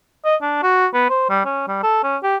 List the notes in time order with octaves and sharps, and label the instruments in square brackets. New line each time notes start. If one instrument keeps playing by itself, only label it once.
[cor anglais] D#5
D4
F#4
B3
C5
G3
C#4
G3
A4
C#4
G4